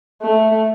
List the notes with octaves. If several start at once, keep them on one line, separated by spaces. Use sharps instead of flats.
A3